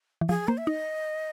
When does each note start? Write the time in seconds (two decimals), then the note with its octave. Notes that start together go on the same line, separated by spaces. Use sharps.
0.21 E3
0.29 F3 G#4
0.48 A#3 C5
0.58 E5
0.67 D#4 D#5